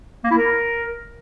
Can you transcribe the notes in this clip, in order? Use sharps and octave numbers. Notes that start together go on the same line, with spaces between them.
A#3
E4
A#4